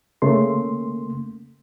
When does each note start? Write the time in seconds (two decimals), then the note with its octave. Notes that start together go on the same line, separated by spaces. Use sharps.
0.22 C#3 A3 A#3 C6